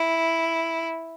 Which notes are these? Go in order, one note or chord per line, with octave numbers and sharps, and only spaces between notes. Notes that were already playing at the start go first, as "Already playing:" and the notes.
Already playing: E4